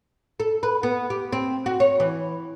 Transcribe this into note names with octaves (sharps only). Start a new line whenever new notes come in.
A4
B4
B3
G4
C4
F#4
C#5
E3